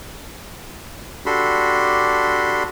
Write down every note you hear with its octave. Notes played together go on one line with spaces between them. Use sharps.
D4 F#4 G4 A4 B5 C6